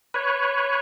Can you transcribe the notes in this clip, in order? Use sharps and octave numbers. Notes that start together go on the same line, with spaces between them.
B4 C#5